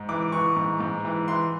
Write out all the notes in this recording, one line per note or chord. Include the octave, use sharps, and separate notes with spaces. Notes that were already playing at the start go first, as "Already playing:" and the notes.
Already playing: G#2
E3 D6
E3 C#6
G#2
G#2
E3
E3 C6